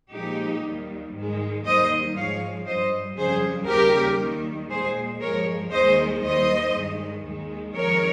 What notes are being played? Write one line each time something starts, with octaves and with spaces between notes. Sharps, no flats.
A#2 F3 G#3 D#4 G4
D#2 D#3 G3
G#2 D#3 G#3
D#2 D#3 G3 C5 D#5
G#2 F3 G#3 C#5 F5
G2 G3 C5 D#5
F2 C#3 G3 G#4 C5
D#2 C#3 G3 G4 A#4
D#2 D#3 G3
A#2 G#3 G#4 C5
G2 F3 G#3 A#4 C#5
D#2 D#3 G#3 C5 D#5
D#2 D#3 G3 C5 D#5
G2 D#3 G#3
D#2 D#3 G#3
F2 D#3 G#3 A#4 C#5